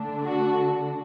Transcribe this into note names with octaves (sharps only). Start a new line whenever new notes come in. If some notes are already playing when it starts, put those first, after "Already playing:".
Already playing: D3 A3 D4
F#4